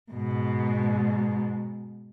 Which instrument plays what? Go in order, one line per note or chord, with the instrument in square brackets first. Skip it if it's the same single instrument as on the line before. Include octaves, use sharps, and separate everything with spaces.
[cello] G#2 B2